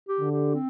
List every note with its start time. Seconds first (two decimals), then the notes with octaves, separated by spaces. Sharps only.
0.08 G4
0.20 D3
0.32 G4
0.54 C4